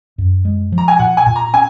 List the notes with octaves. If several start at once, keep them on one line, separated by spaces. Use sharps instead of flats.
F#2
G#3
F3
A#5
G#5
A#2 F#5
G#5
A#2
A#5
C#4 G#5